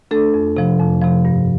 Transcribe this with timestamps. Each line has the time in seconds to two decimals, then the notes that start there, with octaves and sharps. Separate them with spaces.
0.11 A3 D4 A4
0.34 F2
0.57 C3 F3
0.79 F2
1.02 C3 F3
1.25 G2